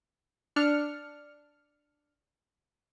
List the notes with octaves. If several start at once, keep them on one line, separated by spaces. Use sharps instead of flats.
D4 F6 C#7